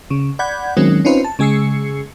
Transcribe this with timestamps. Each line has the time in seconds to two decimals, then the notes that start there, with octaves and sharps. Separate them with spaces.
0.10 C#3
0.39 D5 F#5 B5 G6 G#6
0.77 D#3 F#3 G#3 A#3 C4 C#4
1.05 C4 C#4 D#4 F4 B4 C5
1.24 A5
1.39 C#3 G#3 G#4 E6 C7 C#7